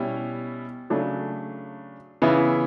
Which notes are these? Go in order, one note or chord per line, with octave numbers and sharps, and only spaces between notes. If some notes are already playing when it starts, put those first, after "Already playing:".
Already playing: B2 G3 C#4 E4
C#3 F#3 A3 D4
C#3 E3 B3 E4